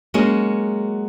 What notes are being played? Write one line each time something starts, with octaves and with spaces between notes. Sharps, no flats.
F#3 G#3 A#3 C#4 F#4 G#4